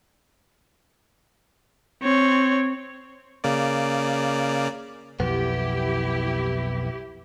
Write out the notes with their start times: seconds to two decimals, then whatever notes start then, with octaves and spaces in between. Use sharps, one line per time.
2.02 C4 C#5
3.44 C#3 A#3 D5
5.20 B1 F2 B3 E4 G4